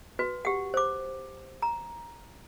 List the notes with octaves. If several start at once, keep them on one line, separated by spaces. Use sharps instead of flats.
F#4 B4
G4 F#5
C5 D6
A#5